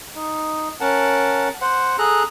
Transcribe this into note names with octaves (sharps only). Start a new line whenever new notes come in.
D#4
C#4 A#4 F#5 A5
C5 F#5
G#4 A4 A#5 F#6